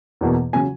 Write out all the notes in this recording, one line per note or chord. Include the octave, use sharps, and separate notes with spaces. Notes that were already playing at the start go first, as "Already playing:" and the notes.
E2 B2 A#3
C#3 F#3 G#5